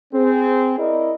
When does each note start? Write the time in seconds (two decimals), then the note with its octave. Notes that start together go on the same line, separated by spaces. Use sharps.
0.14 C4 G#4
0.79 E4 A#4 D5 D#5